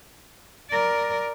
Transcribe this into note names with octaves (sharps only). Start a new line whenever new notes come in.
A#4 D5